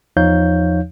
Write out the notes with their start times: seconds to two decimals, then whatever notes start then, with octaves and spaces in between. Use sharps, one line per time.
0.17 E2 F3 D#4 C#5 F5 G6